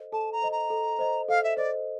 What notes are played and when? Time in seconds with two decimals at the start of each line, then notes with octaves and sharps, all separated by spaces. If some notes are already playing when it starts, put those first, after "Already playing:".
Already playing: A4 C5 D#5
0.12 A4 A5
0.32 A#5
0.42 C5 D#5
0.51 A#5
0.70 A4
0.99 C5 D#5
1.28 A4 F5
1.43 E5
1.57 C5 D5 D#5